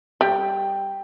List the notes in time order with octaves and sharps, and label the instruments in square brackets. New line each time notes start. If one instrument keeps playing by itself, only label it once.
[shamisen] G3 [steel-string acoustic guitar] G5